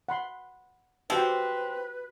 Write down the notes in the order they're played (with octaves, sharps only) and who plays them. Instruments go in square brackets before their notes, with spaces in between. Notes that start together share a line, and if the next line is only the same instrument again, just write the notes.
[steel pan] F#5 B5 C6
[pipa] F3 C4 [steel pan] F#4 G4 E6 [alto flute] B4